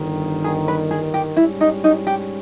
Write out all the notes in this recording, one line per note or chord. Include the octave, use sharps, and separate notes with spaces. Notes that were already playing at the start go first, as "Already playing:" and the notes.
Already playing: G1 G2 D#3
G#4
B4
G#4
G4
G#2 G3 C#4 E4
D#4
D#4
G4